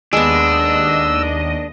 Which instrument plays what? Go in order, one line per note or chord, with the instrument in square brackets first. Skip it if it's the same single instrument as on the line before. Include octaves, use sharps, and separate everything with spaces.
[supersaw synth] D#2 D#5 [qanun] G#3 B3 [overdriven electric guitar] D4 [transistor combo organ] E6